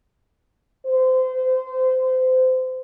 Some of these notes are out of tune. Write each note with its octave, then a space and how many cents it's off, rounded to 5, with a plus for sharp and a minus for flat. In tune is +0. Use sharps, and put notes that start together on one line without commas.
C5 -25